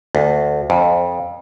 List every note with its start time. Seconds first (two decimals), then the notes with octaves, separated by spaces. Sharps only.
0.15 D2
0.70 F2